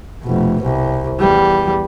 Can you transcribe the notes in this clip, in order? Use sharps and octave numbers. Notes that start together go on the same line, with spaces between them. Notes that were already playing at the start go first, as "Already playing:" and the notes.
F1 B2
C2
E2 G3